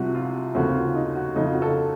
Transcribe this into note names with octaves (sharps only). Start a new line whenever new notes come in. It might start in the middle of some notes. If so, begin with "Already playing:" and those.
Already playing: C2 C3 F3 F#4
F4
D#2 C#3 A3 C4 F#4
F4
D#4
F#4
F2 C#3 A3 D#4
F4
F#4
A4